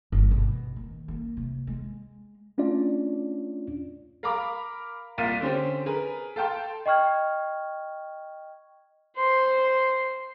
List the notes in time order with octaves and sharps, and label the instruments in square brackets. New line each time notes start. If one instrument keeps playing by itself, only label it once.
[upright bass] G1
B2
D#3
A#3
C3
G#3
[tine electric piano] A3 C#4 D4 F4 D5
[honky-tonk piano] A#4 F5 A#5 B5 D6 F6
C2 A#3 F4 A6 B6 D#7
D3 C4 C#4 G4
G#4 A#4 B4
A4 F5 G5 A5 C6
[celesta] D#5 G5 C#6 F6 G#6
[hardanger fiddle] C5 C6